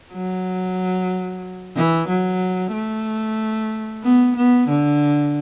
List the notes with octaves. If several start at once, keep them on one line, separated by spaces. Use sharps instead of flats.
F#3
E3
F#3
A3
B3
B3
D3